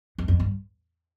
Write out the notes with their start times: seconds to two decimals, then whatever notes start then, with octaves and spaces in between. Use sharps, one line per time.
0.18 E2
0.28 F2
0.40 G2